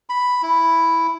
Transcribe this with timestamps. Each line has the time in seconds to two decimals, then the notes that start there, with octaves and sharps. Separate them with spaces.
0.09 B5
0.42 E4